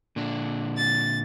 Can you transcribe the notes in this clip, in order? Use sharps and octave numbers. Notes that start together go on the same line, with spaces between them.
A#2 D3 D4
A6